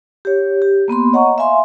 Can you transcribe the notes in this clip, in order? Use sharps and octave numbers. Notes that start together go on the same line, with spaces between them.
G4 C#5
G4
A#3 B3 B5 C6
C#5 D#5 F#5 A#5 C#6
E5 F5 G#5 C6